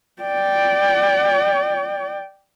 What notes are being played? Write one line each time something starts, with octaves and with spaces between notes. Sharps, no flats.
D5 G5